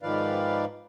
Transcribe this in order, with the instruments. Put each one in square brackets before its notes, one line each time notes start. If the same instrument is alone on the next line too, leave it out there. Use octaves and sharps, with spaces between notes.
[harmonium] G#2 D#3 F3 B4 D5 F5